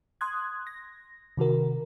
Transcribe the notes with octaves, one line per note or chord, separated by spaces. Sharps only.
C6 D#6 F#6 G#6
A#6
C3 D#3 F#4 A#4